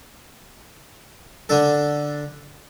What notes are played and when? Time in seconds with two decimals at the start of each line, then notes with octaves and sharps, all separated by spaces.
1.49 D3 D4 A4